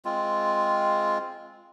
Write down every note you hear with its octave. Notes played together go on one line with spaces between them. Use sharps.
G#3 C4 F4